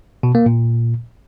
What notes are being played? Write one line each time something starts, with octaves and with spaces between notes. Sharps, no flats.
B2
A#3
A#2